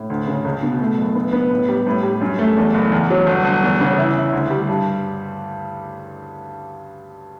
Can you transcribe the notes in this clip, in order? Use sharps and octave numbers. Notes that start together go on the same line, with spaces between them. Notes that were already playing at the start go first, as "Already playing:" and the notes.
Already playing: A2
D2
C#3
C#2
B2
A3
F#1
B3
B3
A2
G3
A2
G3
F#2
A3
E2
F#1
E2
F#3
G1
G1
E2
C#3
E4
E4
D2
G3
G2
G2